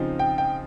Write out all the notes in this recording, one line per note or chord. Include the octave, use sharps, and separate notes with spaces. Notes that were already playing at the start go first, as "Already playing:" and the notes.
Already playing: C#3 F3 C4 D#4
G5
G5